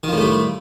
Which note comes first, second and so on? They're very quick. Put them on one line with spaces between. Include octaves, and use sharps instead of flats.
D#3 F3 A2 A3 G3